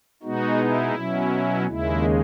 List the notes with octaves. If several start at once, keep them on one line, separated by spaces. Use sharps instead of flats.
B2 G#3 B3 D#4 F#4
E4
B2 F#3 C#4
D#2 C#3 G#3 E4